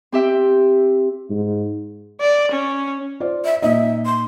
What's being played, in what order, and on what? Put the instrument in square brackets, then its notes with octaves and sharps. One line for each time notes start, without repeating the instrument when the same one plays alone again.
[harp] C4 G4 E5 G5
[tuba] G#2
[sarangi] D5
C#4
[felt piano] F4 C5 D5
[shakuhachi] E5
[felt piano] A#2 D#4 D#5 [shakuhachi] E5
[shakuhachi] C6